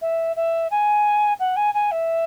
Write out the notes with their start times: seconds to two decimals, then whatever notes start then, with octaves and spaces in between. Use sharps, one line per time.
0.01 E5
0.36 E5
0.70 G#5
1.39 F#5
1.56 G#5
1.73 G#5
1.91 E5